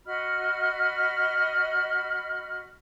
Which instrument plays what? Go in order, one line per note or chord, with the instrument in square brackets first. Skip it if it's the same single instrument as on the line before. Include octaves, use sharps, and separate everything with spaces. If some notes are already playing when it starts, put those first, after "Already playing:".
[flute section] F#4 D#5 B5 F6